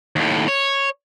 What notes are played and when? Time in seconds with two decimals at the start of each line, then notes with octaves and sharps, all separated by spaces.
0.16 D#2 A2
0.48 C#5